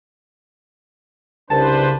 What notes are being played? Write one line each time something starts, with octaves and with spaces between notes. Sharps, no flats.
C2 C#3 D4 B4 C5 A5